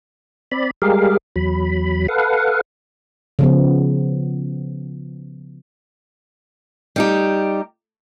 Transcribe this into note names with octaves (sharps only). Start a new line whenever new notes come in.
C4 D5 B5
G3 G#3 G4 G#4 A#4 F5
E2 F#3 B5
A4 B4 F5 F#5
C#3 F3 B3
G3 D#4 G4